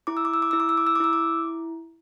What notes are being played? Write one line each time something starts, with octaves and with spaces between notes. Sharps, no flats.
E4 D6
E6
D6
E6
D6
E4 E6
D6
E6
D6
E6
D6
E4 E6
D6